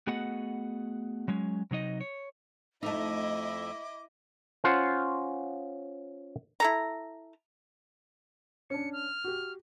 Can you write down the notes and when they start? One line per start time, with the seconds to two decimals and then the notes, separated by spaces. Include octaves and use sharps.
0.07 A3 B3 F#4 G#4 D#5 F#5
1.28 F#3 G#3 C#4
1.71 C3 F#3 D#4 D#5
2.01 C#5
2.83 F2 A3 D#4 E4 D#5 E5 D6
4.64 C#4 F4 C5 F#5
6.60 E4 A4 A#5
8.70 C#4 D4 C#7
8.93 F6
9.24 F#4 G4